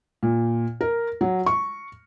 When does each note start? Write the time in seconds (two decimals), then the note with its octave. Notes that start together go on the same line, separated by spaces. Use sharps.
0.23 A#2
0.81 A#4
1.21 F#3
1.46 C#6